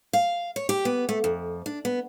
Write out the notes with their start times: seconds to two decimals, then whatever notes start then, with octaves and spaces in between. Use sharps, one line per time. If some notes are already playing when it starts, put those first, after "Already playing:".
0.13 F5
0.56 C#5
0.69 G4
0.85 B3
1.09 A3
1.24 F2
1.66 D4
1.85 B3